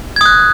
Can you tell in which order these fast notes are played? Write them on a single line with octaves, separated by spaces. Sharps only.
G#6 D#6 F#6